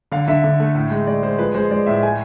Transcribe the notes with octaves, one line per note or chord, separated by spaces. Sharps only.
D3 F5
D3 E5
D3
A3
A2
G#3
G#3 D5
G#3 C5
F3 B4
G#3 C5
G#3 D5
A2 E5
A3 G#5